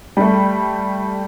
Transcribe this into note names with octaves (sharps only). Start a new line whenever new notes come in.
G3 A3